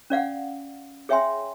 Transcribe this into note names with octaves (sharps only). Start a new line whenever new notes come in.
C#4 D5 F5 F#5
G#4 C#5 E5 G5 G#5 C6